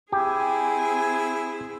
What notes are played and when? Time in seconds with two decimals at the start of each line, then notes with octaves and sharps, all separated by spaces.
0.12 C4 E4 G4 G#4 G#5